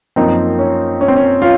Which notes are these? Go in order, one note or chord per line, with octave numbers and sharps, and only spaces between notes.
F#2 F3 A#3 C4 D#4
C#4
C#4
C4
C#4
C#4 F4